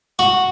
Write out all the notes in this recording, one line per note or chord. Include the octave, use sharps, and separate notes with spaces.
F#4